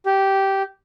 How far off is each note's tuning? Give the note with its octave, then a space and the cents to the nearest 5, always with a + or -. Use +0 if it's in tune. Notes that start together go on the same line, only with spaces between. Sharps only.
G4 -10